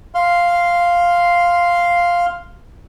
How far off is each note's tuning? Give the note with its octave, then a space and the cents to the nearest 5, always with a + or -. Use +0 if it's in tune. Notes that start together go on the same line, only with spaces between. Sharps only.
F5 +0 C6 +0